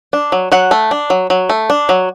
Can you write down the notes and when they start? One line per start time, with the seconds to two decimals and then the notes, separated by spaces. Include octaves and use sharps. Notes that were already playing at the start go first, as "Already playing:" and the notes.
0.13 D4
0.32 F#3
0.52 F#3 F#5
0.71 A3
0.91 D4
1.10 F#3
1.30 F#3
1.49 A3
1.70 D4
1.89 F#3